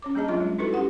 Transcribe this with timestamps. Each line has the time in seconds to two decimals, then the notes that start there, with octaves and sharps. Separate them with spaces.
0.02 C#4 C#5 D6
0.14 G3 A#3 D4 G#4 D#5 A5
0.28 F#3 C4 F4 C#5 C6
0.40 G3 G#3 C#4
0.58 D#4 E4 F#4 A4 B4
0.73 C#4 F#4 G4 F#5 C6